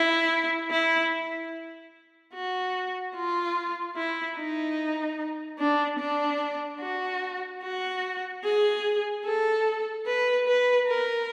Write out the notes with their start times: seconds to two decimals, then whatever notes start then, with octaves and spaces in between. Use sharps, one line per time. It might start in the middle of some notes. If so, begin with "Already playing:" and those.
Already playing: E4
0.71 E4
2.34 F#4
3.15 F4
3.96 E4
4.37 D#4
5.59 D4
5.99 D4
6.81 F#4
7.63 F#4
8.44 G#4
9.25 A4
10.06 B4
10.47 B4
10.88 A#4